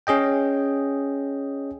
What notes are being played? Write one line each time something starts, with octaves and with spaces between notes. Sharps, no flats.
C#4 G#4 D#5 G5